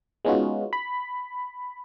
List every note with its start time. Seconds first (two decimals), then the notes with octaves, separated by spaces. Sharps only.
0.25 G#3 B3 C#4 D#4 F4 F#4
0.73 B5